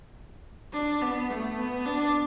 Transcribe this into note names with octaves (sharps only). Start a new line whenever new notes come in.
D4
B3
A3
B3
D4